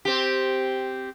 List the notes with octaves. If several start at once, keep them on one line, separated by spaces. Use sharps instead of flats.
C4 G4